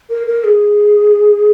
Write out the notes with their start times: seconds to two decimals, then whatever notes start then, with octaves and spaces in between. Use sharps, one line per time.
0.10 A#4
0.27 A#4
0.44 G#4